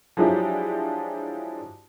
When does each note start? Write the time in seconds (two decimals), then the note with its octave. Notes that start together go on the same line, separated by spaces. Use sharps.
0.17 F3 F#3 G#3 D4 E4 G4